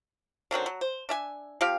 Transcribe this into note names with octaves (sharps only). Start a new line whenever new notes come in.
D3 D#3 F#3 C4
F#3
C5
D4 E5 G#5
F3 C4 G4 F5